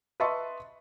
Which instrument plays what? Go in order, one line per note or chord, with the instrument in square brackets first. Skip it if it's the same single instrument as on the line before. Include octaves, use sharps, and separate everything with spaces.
[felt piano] B4 D#5 E5 A5 C6 C#6